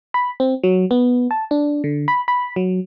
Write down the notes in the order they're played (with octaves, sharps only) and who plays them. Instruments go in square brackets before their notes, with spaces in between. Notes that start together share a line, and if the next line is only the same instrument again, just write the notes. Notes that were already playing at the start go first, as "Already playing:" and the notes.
[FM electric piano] B5
C4
F#3
B3
A5
D4
D3
B5
B5
F#3